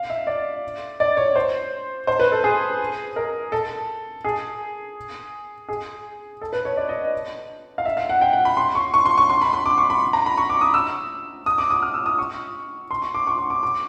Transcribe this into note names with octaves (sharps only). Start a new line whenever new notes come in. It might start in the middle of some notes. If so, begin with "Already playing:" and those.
Already playing: F5
E5
D5
D5
C#5
C5
C5
B4
A4
G#4
A#4
A4
G#4
G#4
A4
B4
C#5
D5
D#5
F5
E5
F5
F#5
G5
F#5
B5
C6
C#6
C#6
C6
C#6
C6
B5
C6
D6
C#6
B5
A#5
B5
C#6
D6
D#6
E6
D#6
D6
D#6
F6
E6
D#6
C#6
C6
C#6
D6
C#6
D6
D6
D6